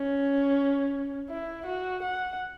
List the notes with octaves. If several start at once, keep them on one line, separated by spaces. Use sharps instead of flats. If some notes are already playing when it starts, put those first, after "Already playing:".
Already playing: C#4
E4
F#4
F#5